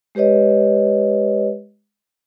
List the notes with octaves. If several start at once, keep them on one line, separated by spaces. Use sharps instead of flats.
G#3 G4 B4 C#5 D#5